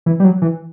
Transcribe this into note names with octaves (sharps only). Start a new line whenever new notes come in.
E3
G3
F#3
E3